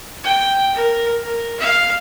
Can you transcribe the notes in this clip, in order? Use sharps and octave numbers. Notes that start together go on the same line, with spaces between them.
G5
A#4
A#4
F5